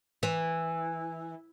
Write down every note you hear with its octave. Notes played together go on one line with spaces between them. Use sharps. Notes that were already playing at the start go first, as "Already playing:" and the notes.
E3